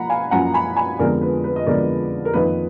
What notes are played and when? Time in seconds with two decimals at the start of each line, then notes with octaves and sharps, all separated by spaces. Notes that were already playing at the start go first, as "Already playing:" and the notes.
Already playing: F3 A#3 F#5 A#5 B5
0.09 F5 G#5
0.31 F#2 F3 A#3 F#5 A#5
0.54 G#5 B5
0.76 G#5 B5
0.99 F2 D3 G#3 B3 A#4 D5
1.22 B4
1.44 B4
1.56 D#5
1.66 F2 D3 G#3 B3 A#4 D5
2.25 A#4
2.34 F2 D#3 A#3 B4